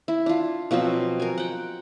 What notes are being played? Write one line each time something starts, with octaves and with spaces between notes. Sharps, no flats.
E4
D4 F4
B2 F3 F#3 C4
A#4 G#5
F#5 G5